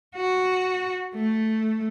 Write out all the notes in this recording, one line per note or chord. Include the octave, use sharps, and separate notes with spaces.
F#4
A3